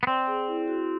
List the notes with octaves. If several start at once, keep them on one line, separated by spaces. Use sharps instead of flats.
B3
C4 D5
G#4
E4
F#4